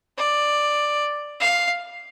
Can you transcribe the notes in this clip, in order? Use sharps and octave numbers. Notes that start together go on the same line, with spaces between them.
D5
F5